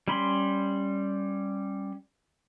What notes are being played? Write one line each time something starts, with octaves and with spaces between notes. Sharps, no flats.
G3 C#4 B5 C6